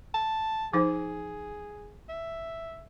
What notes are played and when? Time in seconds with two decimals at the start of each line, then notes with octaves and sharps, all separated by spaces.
0.14 A5
0.73 F3 D#4 G#4 C5
2.09 E5